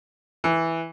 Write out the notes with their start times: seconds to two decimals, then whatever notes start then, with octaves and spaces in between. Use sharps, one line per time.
0.44 E3